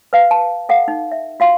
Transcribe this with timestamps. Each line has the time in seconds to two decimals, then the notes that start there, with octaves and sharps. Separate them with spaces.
0.13 B4 F5
0.31 A5
0.69 A4 F5 F#5
0.88 D#4
1.12 E5
1.40 F#4 F5 C6